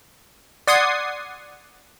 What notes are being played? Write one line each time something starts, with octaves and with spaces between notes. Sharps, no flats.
D5 F#5 C6 D#6 G#6 C7